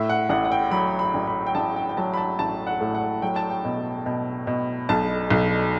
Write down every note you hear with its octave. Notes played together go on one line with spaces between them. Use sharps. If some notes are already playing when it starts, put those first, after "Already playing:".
Already playing: A2 E5
F#5
A1 F#5
F#5
G5
F#3 B5
B5
A1
B5
G5
A1 A5
G5
G5
F#3 A5
B5
A5
A1 A5
F#5
A2
F#5
F#3 G5
A5
G5
B2
B2
B2
B1 A5
B1